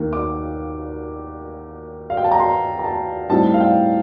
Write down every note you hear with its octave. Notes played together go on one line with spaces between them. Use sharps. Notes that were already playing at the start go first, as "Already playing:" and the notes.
Already playing: D#2 D#3 A#3
D6
F5
G5
A5
A#5
C6
A#5
A5
A2 G3 C4 D#4 A5
F5
G5